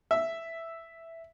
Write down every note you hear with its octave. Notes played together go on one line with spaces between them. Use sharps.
E5